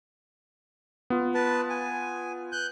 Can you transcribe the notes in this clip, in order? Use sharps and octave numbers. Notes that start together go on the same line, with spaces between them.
B3 F4
B4 A5
G#5
F#6 G6